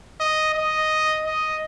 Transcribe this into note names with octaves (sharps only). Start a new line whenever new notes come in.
D#5
D#5
D#5